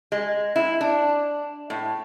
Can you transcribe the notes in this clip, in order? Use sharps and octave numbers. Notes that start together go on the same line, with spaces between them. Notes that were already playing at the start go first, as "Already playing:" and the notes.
G#3
E4
D4
A2